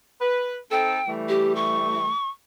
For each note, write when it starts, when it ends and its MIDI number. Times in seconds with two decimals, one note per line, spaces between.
0.21 0.57 71
0.71 1.00 60
0.71 1.00 63
0.71 1.00 69
0.71 1.10 79
1.08 2.10 52
1.08 2.10 55
1.08 2.10 57
1.29 1.53 67
1.56 2.29 85